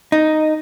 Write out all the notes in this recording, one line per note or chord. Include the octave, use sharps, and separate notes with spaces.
D#4